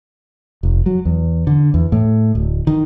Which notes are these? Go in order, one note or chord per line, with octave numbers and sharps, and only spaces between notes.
F1
F#3
E2
D3
E2
A2
D1
D#3